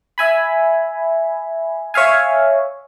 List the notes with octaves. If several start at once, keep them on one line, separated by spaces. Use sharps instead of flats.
E5 G#5 B5
C#5 E5 F5 G#5